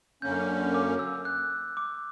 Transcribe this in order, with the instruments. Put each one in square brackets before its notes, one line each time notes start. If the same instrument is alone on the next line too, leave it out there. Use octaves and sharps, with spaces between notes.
[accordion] F#2 D3 A#3 C#4 [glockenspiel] G6
[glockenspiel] D6
E6
F#6
D6